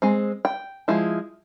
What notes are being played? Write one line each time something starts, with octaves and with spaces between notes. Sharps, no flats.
G#3 C4
G5
F3 G#3 E4